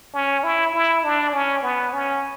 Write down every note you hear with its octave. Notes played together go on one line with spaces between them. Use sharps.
C#4
E4
E4
D4
C#4
B3
C#4